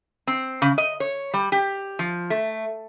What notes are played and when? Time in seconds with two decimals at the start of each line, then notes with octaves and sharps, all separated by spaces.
0.27 C4
0.62 C#3
0.78 D#5
1.00 C#5
1.34 G3
1.52 G4
1.99 F3
2.30 A3